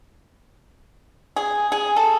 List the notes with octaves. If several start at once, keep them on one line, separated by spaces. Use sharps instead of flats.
G#4
G#4
A4